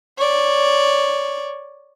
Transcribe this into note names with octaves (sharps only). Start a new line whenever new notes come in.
C#5 D5